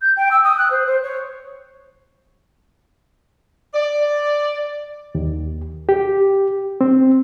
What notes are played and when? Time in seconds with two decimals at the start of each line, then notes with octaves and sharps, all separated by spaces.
0.02 G6
0.16 G5
0.31 E6
0.44 D#6
0.58 F#6
0.71 C5
0.86 C5
1.03 C#5
3.74 D5
5.15 D#2
5.89 G4
6.81 C4